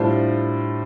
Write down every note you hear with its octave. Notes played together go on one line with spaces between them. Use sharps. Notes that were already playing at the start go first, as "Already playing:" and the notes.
Already playing: A2 G3 D4 F4 C5